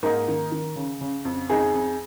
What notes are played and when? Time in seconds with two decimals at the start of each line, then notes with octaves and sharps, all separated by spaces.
0.03 G#2 A#3 D#4
0.28 D#3
0.52 D#3
0.76 C#3
1.01 C#3
1.25 F2
1.49 F2 D#4 G#4
1.73 F2